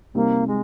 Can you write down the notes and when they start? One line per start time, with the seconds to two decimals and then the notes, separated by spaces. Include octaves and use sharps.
0.15 C3 G3 A#3 C4 D#4
0.48 G#3